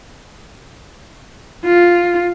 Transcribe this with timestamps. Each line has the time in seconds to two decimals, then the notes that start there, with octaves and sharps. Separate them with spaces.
1.65 F4